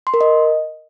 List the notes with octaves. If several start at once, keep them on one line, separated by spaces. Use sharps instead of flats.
C6
A#4
D#5